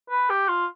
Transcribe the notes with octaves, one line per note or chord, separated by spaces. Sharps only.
B4
G4
F4